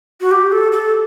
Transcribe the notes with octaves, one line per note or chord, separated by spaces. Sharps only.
F#4
G4
A4
A4